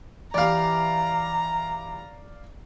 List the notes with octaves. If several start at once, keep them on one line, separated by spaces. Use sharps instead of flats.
E3 G4 D5 F5 A#5